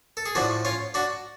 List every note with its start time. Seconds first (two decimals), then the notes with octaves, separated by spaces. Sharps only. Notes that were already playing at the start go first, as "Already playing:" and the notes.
0.17 A4
0.26 G#4
0.35 A2 F3 D4 F#4
0.65 C#4 F4
0.94 D4 F#4